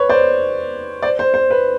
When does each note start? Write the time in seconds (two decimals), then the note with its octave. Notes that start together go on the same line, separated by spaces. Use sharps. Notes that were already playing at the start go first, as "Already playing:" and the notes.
Already playing: B4 C#5
0.09 C5 D5
1.02 C5 D5
1.19 C5
1.34 C5
1.51 B4